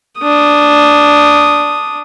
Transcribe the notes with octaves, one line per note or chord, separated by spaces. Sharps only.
D4 D#6